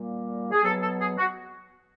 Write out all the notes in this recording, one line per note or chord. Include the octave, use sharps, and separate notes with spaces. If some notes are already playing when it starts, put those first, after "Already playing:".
Already playing: A#2 G3 A#3
G#4
B2 F#3 B3 A4
A4
G#4
F#4